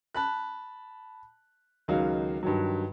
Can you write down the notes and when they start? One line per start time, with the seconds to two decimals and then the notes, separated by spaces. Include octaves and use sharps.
0.14 A5 B5 F#6
1.88 C#2 D#3 F#3 F5
2.43 G2 D#3 F#3